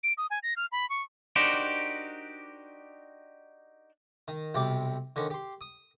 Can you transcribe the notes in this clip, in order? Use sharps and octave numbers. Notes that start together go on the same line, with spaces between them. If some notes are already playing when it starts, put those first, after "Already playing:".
D7
D#6
G#5
A#6
F6
B5
C#6
D4 D#4 F#4 G4 A#4 C5
D#3
B1 C3 G3 G5 D6
D3 D#3 C#4
G4 C6
D#6